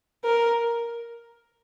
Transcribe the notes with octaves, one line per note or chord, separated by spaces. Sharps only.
A#4